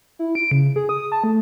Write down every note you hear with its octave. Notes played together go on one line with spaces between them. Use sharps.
E4
D7
C#3
G#4
D#6
A5
A3